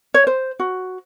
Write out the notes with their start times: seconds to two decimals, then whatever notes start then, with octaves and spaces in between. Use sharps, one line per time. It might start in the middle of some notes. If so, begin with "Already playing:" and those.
0.14 C#5
0.27 C5
0.60 F#4